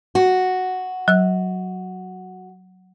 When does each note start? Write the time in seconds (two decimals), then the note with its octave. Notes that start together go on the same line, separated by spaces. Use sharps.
0.15 F#4
1.08 F#3 E6